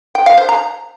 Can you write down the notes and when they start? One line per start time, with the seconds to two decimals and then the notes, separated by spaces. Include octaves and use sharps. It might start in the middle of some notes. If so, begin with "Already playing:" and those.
0.15 G5
0.26 F5
0.37 C5
0.49 A#5